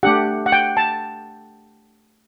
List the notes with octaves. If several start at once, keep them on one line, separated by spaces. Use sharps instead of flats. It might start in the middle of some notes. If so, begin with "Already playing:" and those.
A3 D4 G4 F#5
F#5
G5
A5